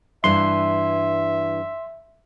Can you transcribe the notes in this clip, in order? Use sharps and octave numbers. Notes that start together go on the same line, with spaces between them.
G2 E3 D4 E5 C6